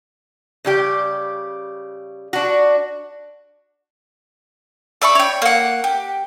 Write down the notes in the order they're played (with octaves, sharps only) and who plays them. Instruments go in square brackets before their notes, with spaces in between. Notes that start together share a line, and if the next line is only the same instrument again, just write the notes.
[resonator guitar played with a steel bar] C#3 G3 G4
D4 F#4
[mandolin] D5 E5 B5 C#6
C#5 G5
A#3 F#5
G4